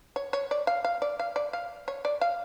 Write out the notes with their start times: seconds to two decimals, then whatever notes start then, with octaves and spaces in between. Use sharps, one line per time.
0.16 C#5
0.33 C#5
0.51 D5
0.67 F5
0.84 F5
1.02 D5
1.19 F5
1.36 D5
1.53 F5
1.88 C#5
2.05 D5
2.21 F5